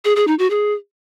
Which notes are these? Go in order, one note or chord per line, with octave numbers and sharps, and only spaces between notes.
G#4
G#4
D#4
F#4
G#4